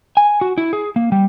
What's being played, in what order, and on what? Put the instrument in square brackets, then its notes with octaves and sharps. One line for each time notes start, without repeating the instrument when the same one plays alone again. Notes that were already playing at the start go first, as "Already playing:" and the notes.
[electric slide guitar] G#5
F#4
E4
G#4
A#3
G3